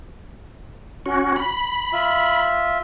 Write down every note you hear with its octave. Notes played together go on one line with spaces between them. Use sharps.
C#4 F#4
B5
F4 E5